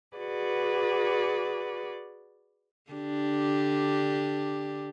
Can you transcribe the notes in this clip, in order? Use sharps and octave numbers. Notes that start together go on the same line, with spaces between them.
F#4 G#4 B4 D5
D3 D4 G4